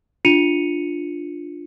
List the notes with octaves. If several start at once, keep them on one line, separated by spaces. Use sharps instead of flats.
D4 F4 C#7 D#7 F7